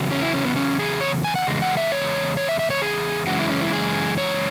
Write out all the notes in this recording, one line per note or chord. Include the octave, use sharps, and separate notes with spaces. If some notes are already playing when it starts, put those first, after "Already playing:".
Already playing: E2 C#3 F#3
C#4
E4
C#4
B3
C#4
G#4
C#5
G#5
F#5
E2 C#3 G#3
F#5
E5
C#5
C#5
E5
E5
C#5
G#4
F#2 C#3 E3 G#3 F#4
E4
C#4
E4
G#4
C#5